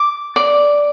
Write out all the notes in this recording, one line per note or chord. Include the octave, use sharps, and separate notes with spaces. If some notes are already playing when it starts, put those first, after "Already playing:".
Already playing: D6
D5